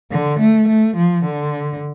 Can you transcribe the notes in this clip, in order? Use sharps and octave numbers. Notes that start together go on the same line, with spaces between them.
D3
A3
A3
F3
D3